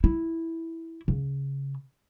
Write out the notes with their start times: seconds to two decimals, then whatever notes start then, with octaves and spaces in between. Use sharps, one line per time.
0.04 E4
1.08 C#3